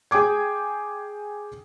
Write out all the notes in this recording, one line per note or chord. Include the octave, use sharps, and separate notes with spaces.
G#4 G5 G#5 D6 G#6